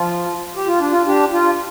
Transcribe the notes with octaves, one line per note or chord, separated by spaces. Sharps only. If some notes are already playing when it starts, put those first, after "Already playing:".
Already playing: F3 F4
G4
F4
D4
F4
D4 G4
F4